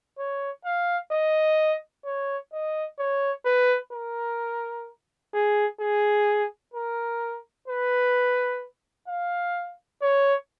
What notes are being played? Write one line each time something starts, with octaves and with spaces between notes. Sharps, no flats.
C#5
F5
D#5
C#5
D#5
C#5
B4
A#4
G#4
G#4
A#4
B4
F5
C#5